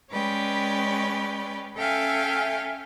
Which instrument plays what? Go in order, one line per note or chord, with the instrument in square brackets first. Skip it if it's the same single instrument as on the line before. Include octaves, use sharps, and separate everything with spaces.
[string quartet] G#3 C#4 B4 C#5 D5 G5
C#4 A4 E5 F5 G5 G#5